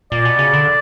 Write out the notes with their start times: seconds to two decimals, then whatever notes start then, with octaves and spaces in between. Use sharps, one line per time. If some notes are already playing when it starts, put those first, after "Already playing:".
0.12 A#2 D5
0.25 B2
0.39 C#3
0.53 D3